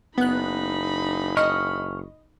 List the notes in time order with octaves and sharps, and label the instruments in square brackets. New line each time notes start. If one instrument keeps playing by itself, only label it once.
[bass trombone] F#1 [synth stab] B3 F#6 [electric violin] D#4 B5
[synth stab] D#5 [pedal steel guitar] C#6 F6